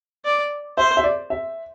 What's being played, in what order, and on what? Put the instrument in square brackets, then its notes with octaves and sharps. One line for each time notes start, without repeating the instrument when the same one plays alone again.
[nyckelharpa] D5
[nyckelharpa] C5 [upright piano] E5
[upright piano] E5
D5
E5